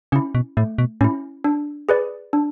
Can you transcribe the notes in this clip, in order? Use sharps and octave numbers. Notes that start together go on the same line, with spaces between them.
C#3 C#4 E4
B2
A2 A3
B2
A2 C#4 E4
D4
G#4 B4 D5
D4